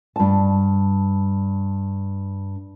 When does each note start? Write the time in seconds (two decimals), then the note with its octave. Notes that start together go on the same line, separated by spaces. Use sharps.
0.16 G2 A5